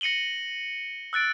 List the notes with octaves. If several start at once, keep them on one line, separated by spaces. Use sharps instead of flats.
A#6 C#7 D#7 F#7 G7
E6 F#6 A6 D7